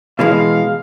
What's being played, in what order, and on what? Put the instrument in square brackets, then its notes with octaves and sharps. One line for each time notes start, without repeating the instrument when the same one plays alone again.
[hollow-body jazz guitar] B2 E3 G#3 [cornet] F5